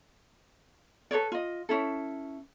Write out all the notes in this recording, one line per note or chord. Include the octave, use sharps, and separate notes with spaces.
A4 B4 C#5 D5
F4 D#5
C#4 E4 A4